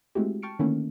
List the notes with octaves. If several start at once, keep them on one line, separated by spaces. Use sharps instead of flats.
G#3 A3 C4 E4 F#4 G4
G5 A5 C#6 F6 C#7 D7
D3 D#3 A3 A#3 C#4 E4